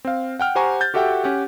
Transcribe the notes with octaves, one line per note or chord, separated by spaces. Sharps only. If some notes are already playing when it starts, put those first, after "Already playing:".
C4 F5
F#5 G5 F6
G4 C5 F#5 G#5 A#5 C#6
G6 A6
F#4 G4 A4 E5 F#5 G5
C#4 G4 F#5